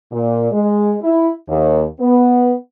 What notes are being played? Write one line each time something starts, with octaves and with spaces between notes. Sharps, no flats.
A#2
G#3
E4
D#2
B3